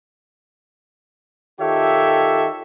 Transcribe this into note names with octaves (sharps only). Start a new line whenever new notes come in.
D#3 F4 G4 A4 C#5 E5